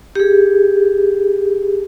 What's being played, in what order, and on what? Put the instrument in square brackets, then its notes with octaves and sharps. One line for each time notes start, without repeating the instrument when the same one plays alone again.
[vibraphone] G4 G#4